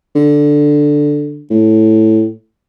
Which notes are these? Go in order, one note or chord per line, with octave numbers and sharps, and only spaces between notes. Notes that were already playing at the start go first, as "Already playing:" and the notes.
D3
A2